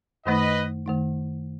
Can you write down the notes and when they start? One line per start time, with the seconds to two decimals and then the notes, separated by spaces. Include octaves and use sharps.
0.25 F#2 D#3 A3 D#4 B4 D#5
0.86 F#2 D#3 A3 D#4